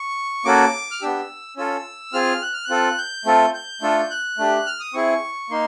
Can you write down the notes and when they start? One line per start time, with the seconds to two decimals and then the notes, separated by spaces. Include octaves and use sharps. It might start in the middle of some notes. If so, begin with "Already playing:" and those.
Already playing: C#6
0.45 A#3 C#4 F#4 A4 D6
0.91 F6
1.01 B3 D4 G4 E6
1.57 C#4 F4 A4 E6
2.13 C4 F4 G#4 F6
2.42 F#6
2.53 F6
2.64 F#6
2.70 C4 F4 A4
2.98 G6
3.25 A3 C4 F4 A4
3.54 G6
3.81 A3 D4 F4 A4
4.10 F#6
4.38 A3 D4 G4
4.66 F6
4.80 D#6
4.94 C4 E4 G#4 C#6
5.50 A#3 D#4 C6